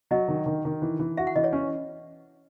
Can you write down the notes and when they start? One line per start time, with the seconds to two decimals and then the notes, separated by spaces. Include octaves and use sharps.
0.11 F#3 D#5
0.28 D#3
0.46 D#3
0.65 D#3
0.82 E3
0.99 E3
1.17 F#4 E5
1.27 F#5
1.36 E3 D#5
1.44 C#5
1.53 C#4